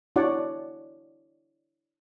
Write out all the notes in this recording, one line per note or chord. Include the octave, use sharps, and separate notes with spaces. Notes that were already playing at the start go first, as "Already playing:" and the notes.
D4 E4 F#4 C#5 D5 F#5